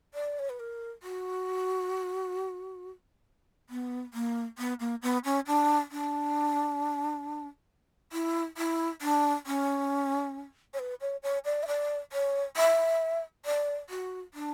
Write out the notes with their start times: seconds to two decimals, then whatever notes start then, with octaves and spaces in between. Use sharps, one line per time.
0.14 D5
0.39 C#5
0.49 B4
0.60 A#4
1.03 F#4
3.70 B3
4.14 A#3
4.58 B3
4.80 A#3
5.02 B3
5.24 C#4
5.47 D4
5.91 D4
8.12 E4
8.57 E4
9.02 D4
9.47 C#4
10.74 C#5
10.79 B4
11.01 C#5
11.23 C#5
11.45 D5
11.63 E5
11.67 D5
12.12 C#5
12.57 E5
13.45 D5
13.90 F#4
14.34 D4